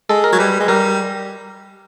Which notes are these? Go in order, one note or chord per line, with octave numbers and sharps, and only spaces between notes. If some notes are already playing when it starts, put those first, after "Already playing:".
G#3 A4
A#4
F#3
G3 B4
G#3
G3 A#4